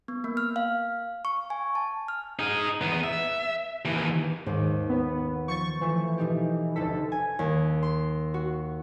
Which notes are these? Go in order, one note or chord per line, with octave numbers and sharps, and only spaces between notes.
B3
A#3
F6
F5
C#6
G#5
A5
F6
D#4 G#4
E2 B3
E5
D#2 E3
D#2 G#2 D6
B3
F3 C#6 A6
E3 F3 A3 A6
B2 D#4 G4
F1 D2 A4 B6
G#5
D#2
C6
F#4